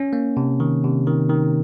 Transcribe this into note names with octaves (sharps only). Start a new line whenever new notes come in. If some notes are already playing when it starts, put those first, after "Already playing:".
Already playing: C#4
A#3
C3
D#3
C3
D#3
D#3